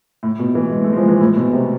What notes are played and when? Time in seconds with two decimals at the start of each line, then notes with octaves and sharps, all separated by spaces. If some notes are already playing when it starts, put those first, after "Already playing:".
0.23 A2
0.39 B2
0.55 E3
0.71 G#3
0.84 A3
0.92 G#3
0.96 F3
1.08 E3
1.21 A2
1.37 B2
1.53 C3